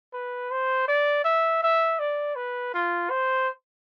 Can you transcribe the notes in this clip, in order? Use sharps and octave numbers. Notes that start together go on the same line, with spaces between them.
B4
C5
D5
E5
E5
D5
B4
F4
C5